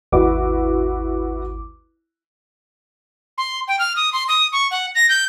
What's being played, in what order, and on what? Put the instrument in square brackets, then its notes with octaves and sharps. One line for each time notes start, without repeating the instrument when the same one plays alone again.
[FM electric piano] G#1 D#2 D6 [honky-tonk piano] E4 F#4 B4
[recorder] C6
G5
F6
D#6
C6
D#6
C#6
F#5
A#6
G6